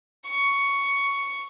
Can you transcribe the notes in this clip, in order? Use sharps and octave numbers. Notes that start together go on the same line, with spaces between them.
C#6